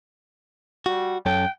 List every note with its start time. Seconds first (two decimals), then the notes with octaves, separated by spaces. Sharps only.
0.86 G3 F#4
1.26 F#2 C#4 A4 G5